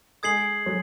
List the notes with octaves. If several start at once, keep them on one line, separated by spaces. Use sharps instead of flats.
G#3 D#6 G#6 C7 F#7
F#3